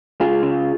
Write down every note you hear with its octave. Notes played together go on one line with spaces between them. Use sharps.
C#2 F4 G#4
C#3